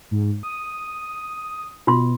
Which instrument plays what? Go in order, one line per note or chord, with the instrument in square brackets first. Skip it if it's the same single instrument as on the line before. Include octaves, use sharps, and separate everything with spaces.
[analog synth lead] G#2
D#6
[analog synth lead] B2 [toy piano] F4 C6